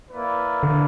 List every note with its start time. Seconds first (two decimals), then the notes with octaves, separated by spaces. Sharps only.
0.10 A#3 E4 B4 D5
0.63 D3